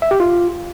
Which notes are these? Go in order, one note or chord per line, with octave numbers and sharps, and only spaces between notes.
E5
G4
F4